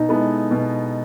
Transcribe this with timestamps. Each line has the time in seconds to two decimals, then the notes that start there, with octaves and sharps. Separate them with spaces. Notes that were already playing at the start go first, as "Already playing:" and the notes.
Already playing: B2 D#4
0.09 G#3 B3 E4 A4
0.51 B2